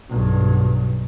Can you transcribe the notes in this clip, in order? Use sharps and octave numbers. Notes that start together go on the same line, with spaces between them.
B1 G2